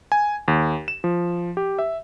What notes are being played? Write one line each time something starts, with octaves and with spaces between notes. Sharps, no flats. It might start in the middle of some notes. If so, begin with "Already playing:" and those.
G#5
D#2
E7
F3
G4
E5